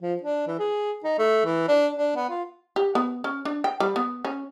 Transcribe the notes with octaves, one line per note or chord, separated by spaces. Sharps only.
F3
D4
E3
G#4
D#4
A3
E3
D4
D4
B3
F4
G4
B3
C#4
D4
G5
G3
B3
C#4